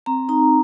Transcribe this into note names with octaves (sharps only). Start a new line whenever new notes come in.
C4 A#5
D#4 A#5